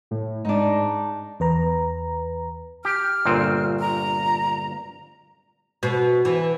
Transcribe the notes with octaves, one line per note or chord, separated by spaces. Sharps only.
A2
G#2 D4 D#4
E2 B4 A#5
G4 F6
G1 A#2 C4
A#5
B2
E3